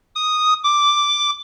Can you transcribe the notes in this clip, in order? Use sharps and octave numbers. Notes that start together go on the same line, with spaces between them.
D#6
D6